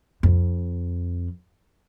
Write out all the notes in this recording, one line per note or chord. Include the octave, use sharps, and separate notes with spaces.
F2